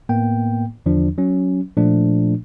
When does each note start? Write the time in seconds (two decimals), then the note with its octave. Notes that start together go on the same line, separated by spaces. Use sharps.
0.09 A2 A#3 B3 G5
0.86 E2 D3 F3 D4
1.18 F#3 C#4
1.77 A#2 F3 A3 D4